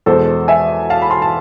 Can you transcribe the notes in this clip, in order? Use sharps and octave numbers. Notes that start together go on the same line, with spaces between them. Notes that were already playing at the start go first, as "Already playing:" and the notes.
E2 B2 G#3 A4 C5
E5 G#5
F5 A5
B5
A5 C6
A5